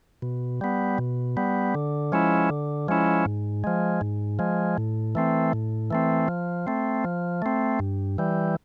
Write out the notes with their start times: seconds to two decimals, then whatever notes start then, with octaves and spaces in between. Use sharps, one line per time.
0.22 B2
0.61 G3 B3
0.98 B2
1.37 G3 B3
1.75 D3
2.12 F3 G#3 C#4 E4
2.50 D3
2.88 F3 G#3 C#4 E4
3.26 G#2
3.64 F3 G#3
4.01 G#2
4.39 F3 G#3
4.78 A2
5.15 E3 A3 C4
5.53 A2
5.91 E3 A3 C4
6.28 F3
6.67 A3 C4
7.04 F3
7.42 A3 C4
7.79 G2
8.18 E3 G3